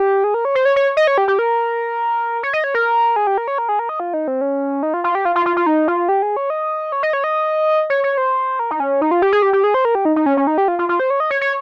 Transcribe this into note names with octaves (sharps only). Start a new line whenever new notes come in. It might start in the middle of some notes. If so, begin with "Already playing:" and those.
Already playing: G4
G#4
A#4
C#5
C5
C#5
C#5
D#5
C#5
G4
G4
A#4
C#5
D#5
C#5
A#4
G#4
G4
A#4
C#5
A#4
G#4
A#4
D#5
F4
D#4
C4
C#4
D#4
F4
F4
G4
F4
F4
F4
F4
D#4
F4
G4
G#4
C#5
D#5
C#5
D#5
C#5
D#5
C#5
C#5
C5
A#4
D#4
C#4
D#4
F4
G4
G#4
G4
G4
G#4
C5
A#4
G4
D#4
D#4
C#4
C#4
D#4
G4
F4
F4
F4
C5
C#5
D#5
C#5
C#5